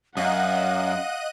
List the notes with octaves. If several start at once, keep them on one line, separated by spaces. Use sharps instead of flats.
F#2 D#5 F5 F#5 F#6 D#7